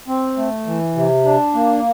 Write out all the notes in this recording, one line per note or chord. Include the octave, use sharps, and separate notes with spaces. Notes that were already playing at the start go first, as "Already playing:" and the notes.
C4
A3
E3
C3
D4
A#3